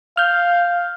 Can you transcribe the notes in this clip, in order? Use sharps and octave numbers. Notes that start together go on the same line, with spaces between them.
F5 F6 G6